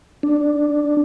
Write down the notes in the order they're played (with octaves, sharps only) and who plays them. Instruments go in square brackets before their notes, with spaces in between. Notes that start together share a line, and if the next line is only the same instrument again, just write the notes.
[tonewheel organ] D4